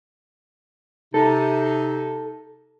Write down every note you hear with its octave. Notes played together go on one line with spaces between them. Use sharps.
C3 D#4 A4